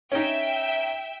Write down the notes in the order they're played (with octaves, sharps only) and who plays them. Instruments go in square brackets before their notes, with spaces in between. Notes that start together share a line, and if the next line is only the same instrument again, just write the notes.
[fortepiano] C#4 D#4 [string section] E5 G5